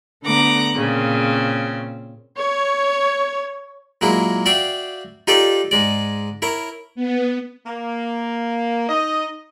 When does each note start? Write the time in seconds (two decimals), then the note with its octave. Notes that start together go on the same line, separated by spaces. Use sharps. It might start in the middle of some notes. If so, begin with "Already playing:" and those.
0.22 D3 A3 B3 A#5 D6 F#6
0.74 A#2 C#3 C4
2.37 C#5
4.01 A#2 F#3 G#3 A#3 E4
4.46 F#4 D5 E5 F5 G5
5.27 D#4 F4 G4 A4 C#5 D5
5.71 G#2 G#3 D5
6.42 E4 A#4 C#5
6.95 B3
7.66 A#3
8.89 D#4 D#5